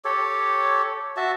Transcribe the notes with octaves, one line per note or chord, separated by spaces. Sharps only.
G4 A4 C#5
F#4 E5 A5